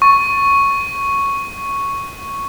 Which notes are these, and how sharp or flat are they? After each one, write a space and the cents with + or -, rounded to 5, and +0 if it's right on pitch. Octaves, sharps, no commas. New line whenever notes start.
C#6 +0